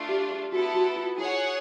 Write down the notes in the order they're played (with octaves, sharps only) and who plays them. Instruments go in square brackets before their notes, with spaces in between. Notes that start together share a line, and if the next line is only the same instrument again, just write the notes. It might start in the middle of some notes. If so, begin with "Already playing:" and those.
Already playing: [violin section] A3 D4 F4
[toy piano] G4
G#4
[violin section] B3 E4 A4 [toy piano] F#4
[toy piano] F#4
F4
[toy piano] E4 [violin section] G#4 C#5 F#5